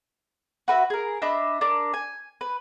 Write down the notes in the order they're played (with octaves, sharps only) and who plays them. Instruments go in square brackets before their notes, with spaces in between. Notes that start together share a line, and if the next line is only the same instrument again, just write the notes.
[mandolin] F#4 B4 E5
G#4 A#4
D4 D#5 E5 B5
D4 A#4 D5
G#5
B4